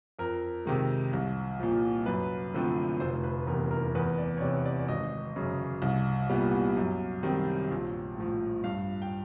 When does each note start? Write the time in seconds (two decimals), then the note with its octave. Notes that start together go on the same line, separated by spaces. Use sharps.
0.19 F2 A#4
0.65 C3 D#3 G#3
1.13 C2
1.60 A#2 F3
2.06 F#2 B4
2.54 D3 F3 A3 C4
3.00 F1 C5
3.24 B4
3.47 E2 A#4
3.52 C3
3.71 A#4
3.95 E2 B4
4.18 D5
4.37 C#5
4.41 C3 E3 D5
4.66 D5
4.80 D5
4.88 G#1 D#5
5.36 F#2 C#3
5.82 C2
6.29 A#2 G3 B3
6.77 F#2
7.23 D#3 G3 C4
7.71 A#1
8.17 A2 F3
8.64 G2 F5
9.02 G5